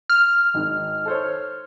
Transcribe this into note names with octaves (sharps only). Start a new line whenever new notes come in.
F6
G#1 D#3
A4 C5 C#5